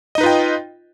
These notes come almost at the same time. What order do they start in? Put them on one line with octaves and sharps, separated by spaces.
D#5 D#4 B4 F4 G5